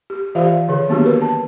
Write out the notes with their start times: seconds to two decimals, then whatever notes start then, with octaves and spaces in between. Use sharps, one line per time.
0.10 G4
0.35 E3 F4 G4 C5 E5 F5
0.69 D3 D#3 G#4
0.88 F#3 A#3 B3 D4 F#4 G4
1.04 G4 A#4 B4
1.22 A5